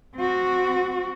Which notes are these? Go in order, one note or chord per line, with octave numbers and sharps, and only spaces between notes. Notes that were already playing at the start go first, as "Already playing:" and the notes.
C4 F#4